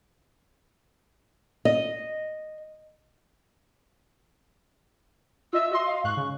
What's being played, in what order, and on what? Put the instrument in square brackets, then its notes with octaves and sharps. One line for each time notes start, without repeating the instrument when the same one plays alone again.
[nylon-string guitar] D#5
[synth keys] F4 D#5 E5 [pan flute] E6
[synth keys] F#4 D#5 C6
[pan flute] F5
[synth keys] G#2 F5 F#6 [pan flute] C#6
[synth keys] C#3